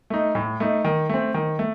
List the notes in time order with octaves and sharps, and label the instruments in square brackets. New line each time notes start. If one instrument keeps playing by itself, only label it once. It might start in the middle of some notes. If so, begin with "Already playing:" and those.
[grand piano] A3 D#4
A2
A3 D#4
D#3
A3 C4
D#3
A3